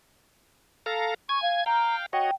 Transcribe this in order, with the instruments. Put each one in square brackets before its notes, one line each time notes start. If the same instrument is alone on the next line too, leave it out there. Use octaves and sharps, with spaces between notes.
[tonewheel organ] A4 F5 A#5
[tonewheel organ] G#5 G#6 [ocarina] C#6
[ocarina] F5
[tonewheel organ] F5 G5 [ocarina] A#5
[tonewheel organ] F#4 C#5 D#5 [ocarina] G5